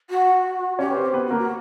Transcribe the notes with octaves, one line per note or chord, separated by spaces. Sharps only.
F#4
C#4 G4 C#5
B4
C4 C5
G4
B3 B4
F#4
A#3 A#4
F#4